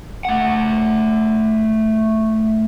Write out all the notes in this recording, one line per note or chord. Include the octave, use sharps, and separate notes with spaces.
A3 F#5